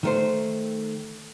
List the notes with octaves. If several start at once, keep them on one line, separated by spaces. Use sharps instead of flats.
D#3 A3 C5